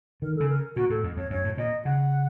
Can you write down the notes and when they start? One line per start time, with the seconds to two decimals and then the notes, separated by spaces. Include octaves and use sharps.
0.22 D#3 A#4
0.36 C#3 A4
0.49 A#4
0.76 A#2 F#4
0.90 A2 A4
1.04 F2
1.17 F2 C#5
1.30 F#2 C#5
1.44 A2
1.58 A#2 D#5
1.85 C#3 F#5